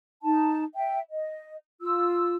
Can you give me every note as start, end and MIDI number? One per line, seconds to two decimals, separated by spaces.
0.23 0.64 63
0.23 0.64 81
0.74 0.99 76
0.74 0.99 79
1.10 1.55 75
1.81 2.36 65
1.81 2.36 88